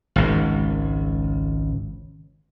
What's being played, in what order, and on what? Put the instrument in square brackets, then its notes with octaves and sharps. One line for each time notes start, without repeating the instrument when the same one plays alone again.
[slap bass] G#1 C#2